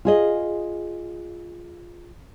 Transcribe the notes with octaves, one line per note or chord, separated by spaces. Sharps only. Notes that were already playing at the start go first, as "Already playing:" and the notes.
F4 G#4 D#5